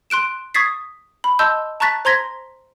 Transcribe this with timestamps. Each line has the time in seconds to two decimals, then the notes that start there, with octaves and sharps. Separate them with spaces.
0.10 C6 F#6 D7 E7
0.54 C#6 D#6 G#6 A6 B6 C7
1.24 B5
1.39 D#5 A5 C6 E6 G6
1.80 A5 A#5 C#6 F#6 A6 B6
2.05 C5 A#5 C6 G#6 A#6 B6